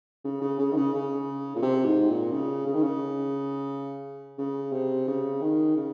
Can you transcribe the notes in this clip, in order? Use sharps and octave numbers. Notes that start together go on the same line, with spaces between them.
C#3
C#3
C#3
D#3
C#3
C#3
A#2
C3
G#2
A#2
C#3
C#3
D#3
C#3
C#3
C3
C#3
D#3
C#3